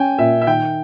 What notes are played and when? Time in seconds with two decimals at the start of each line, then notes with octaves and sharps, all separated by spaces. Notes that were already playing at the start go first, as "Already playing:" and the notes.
Already playing: C#4 G5 G#5
0.18 A#2 E5
0.41 E5
0.47 D#3 G5